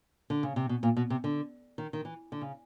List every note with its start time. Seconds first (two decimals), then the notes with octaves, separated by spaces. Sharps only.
0.30 D3
0.43 C#3
0.56 C3
0.69 B2
0.83 A#2
0.97 B2
1.10 C3
1.24 D3
1.78 D#3
1.93 D#3
2.05 E3
2.32 D3
2.41 C#3